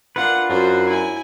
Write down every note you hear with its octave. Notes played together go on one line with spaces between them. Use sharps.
D4 F4 A#4 B4 F#5
F#2 F#4 C5
E4 G#5